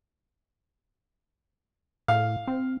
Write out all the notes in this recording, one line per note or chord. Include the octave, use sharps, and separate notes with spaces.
A2 F5
C4